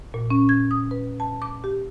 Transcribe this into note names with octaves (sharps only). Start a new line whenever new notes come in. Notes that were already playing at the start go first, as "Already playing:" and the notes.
A#2
C#4
G#6
D#6
B4
A5
D6
G4